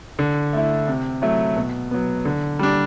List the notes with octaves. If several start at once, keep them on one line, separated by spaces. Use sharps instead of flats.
D3
A3 E4
C3
F#3 A3 E4
B2
F#3 B3
D3
G3 D4